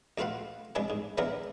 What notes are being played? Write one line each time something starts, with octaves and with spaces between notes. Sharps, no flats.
D2 A3 F4 B4 F5 F#5
C2 G#3 D4 G#4 B4
G#2
C#3 E3 B3 D4 E4 A#4